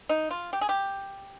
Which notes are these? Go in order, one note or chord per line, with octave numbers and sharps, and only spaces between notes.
D#4
F4
G4
G#4
G4